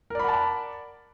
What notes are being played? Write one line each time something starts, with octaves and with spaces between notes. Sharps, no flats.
A#4 D5 F#5 A5 B5